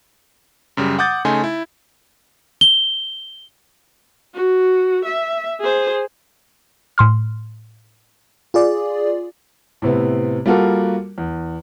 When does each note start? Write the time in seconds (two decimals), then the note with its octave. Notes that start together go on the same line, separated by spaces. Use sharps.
0.77 F#2 C#3 G3
0.98 F#5 D6 D#6 G6 A6
1.25 C#3 A3 D#4 G#5 C6
1.44 E4
2.61 G7
4.34 F#4
5.05 E5
5.60 G#4 C5
6.98 A2 C6 F6
8.54 F4 G#4 D5
9.82 A2 C3 B3
10.46 G3 A#3 F4 F#4 A4 A#4
11.18 E2